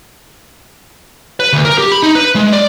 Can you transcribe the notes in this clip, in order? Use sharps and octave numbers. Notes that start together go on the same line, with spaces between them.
B4
D2
A#4
G4
B5
D#4
B4
G#3
D5